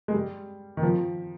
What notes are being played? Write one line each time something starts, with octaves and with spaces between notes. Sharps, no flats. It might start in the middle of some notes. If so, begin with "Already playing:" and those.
G#3
G3
D#3
F3